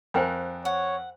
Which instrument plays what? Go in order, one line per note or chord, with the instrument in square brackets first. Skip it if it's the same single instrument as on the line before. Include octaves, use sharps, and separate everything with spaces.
[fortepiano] F2 A#4 F6 [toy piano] C5 G5 G#5
[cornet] C#5 [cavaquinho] F#5